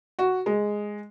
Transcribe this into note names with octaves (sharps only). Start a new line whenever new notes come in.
F#4
G#3